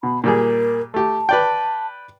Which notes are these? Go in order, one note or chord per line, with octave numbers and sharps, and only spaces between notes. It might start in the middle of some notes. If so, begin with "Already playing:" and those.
B2 B5
A#2 G3 G#4 A#4
A3 G4 A5
B4 D5 G5